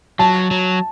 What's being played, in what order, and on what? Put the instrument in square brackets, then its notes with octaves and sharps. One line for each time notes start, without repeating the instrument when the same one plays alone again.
[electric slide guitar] F#3 [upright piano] A5
[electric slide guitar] F#3